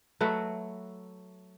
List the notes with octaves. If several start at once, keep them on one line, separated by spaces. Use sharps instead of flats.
F#3 A3 F#4 B4